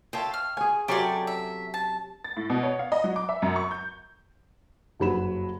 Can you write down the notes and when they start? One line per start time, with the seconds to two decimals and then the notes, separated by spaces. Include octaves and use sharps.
0.13 F4 A4 C#5 E5 G5
0.34 F6
0.57 G#4 C#5 G#5
0.88 C3 F#3 C#4 G4 A4 C#5 D5 C6
1.27 E5
1.74 A5
2.24 A6
2.37 A2
2.50 B2
2.63 C#5
2.79 F5
2.92 D#5
3.04 F#3
3.16 D6
3.29 E5
3.42 F#2
3.56 C#6
3.71 G6
4.99 F#1 G2 F#3 B5 E7